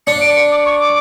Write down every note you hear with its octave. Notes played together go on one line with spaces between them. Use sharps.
D4 C#7
D7
C#7
D6
C#6
D6